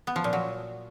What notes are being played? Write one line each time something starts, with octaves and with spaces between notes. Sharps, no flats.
B3
F3
A#2
F#3